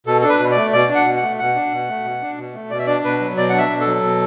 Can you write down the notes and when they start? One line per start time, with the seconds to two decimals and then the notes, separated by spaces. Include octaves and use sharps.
0.07 B2 A4
0.22 D4 A4
0.29 B4
0.40 B2
0.51 D5
0.56 A3
0.73 B2 D5
0.89 D4
0.95 F#5
1.06 B2
1.17 F#5
1.22 A3
1.39 B2 F#5
1.55 D4
1.72 B2
1.89 A3
2.05 B2
2.22 D4
2.38 B2
2.54 A3
2.70 B2 D5
2.78 E5
2.86 D4 D5
3.04 B2 B4
3.21 F#3
3.37 B2 D5
3.49 D4 F#5
3.58 E5
3.70 B2
3.81 A4
3.87 F#3
4.03 B2